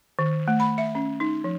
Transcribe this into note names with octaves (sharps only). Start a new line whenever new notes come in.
D#3
A3
B5
E5
C#4
D#4
F3